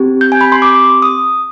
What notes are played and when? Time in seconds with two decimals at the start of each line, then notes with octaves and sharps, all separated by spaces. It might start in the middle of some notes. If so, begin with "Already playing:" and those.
Already playing: C4 G4
0.21 G6
0.32 G#5
0.41 B5
0.52 C6
0.62 D6
1.02 D#6